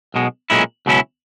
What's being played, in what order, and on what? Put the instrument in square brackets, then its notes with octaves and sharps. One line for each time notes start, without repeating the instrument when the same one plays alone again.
[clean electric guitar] B1 B2 G#3
B1 A#2 G#3 C#4 E4
C#2 B2 F#3 C#4 E4